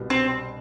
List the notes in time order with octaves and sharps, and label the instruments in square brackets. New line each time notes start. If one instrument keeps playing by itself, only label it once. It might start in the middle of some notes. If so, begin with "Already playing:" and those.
Already playing: [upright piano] C2 B2 G3
[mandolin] C4